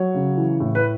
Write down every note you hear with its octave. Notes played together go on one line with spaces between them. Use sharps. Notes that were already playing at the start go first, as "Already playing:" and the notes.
Already playing: F#3 C#5
C#3
E3
A2
B4